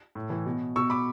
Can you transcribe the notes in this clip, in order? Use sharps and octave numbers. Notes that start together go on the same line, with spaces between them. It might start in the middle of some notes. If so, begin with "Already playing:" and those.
A2
E3
B2
B2 C#6 E6
B5 D6